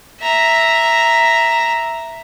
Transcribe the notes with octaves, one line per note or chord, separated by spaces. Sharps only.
E5 A#5